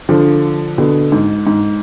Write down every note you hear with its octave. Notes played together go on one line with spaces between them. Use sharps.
D3 F3
B2 D3
G#2
G#2